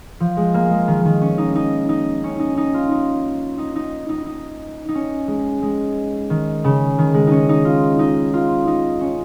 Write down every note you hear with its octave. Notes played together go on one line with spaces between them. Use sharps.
F3
G#3
A#3
G#3
D#3
D#3
C#4
D#4
D#4
D#4
C#4
D#4
D#4
F4
D#4
D#4
D#4
D#4
D#4
D#4
C#4
G#3
G#3
D#3
C#3
D#3
G#3
C#4 D#4
D#4
F4
D#4
F4
D#4
C#4